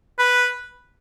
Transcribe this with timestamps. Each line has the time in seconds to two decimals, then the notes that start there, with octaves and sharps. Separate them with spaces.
0.19 B4